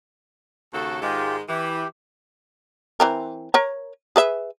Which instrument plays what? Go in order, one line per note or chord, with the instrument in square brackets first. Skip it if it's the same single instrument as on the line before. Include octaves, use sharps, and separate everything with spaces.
[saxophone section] D#2 C#3 A4 [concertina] F#4
[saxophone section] G#2 D#3 G#3 [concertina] F4 G4
[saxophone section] E3 [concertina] G4
[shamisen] E3 C4 A#4
A#4 C#5 A#5
G#4 B4 E5